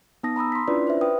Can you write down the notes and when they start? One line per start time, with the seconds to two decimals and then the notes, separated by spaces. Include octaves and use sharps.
0.23 B3 D#4 A5 D#6 A#6
0.36 A#5 B5 D#6 E6
0.52 C6 B6
0.68 C#4 D4 E4 F4 B4 D5
0.87 B4 C5 E5
1.01 B4 G5 D#6